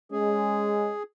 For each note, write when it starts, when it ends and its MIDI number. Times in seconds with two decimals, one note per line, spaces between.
0.12 0.94 56
0.12 0.94 61
0.12 1.03 68